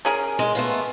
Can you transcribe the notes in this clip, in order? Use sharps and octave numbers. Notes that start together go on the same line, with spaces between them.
C#4 G#4 A#4
G#3
A3 B3 F4